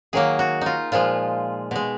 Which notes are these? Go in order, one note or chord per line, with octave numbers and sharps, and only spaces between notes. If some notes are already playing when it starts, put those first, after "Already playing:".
D#3 F#3 A#3 G#4
F#4
D#4 F4
A#2 F3 G#3 F4
B2 G#3